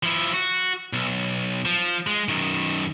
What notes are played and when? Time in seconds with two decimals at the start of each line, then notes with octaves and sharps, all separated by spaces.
0.03 F3 E4
0.34 F#4
0.93 B1
1.65 F3
2.07 G#3
2.29 F#2 D#3